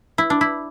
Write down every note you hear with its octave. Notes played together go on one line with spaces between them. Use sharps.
E4
D4
E4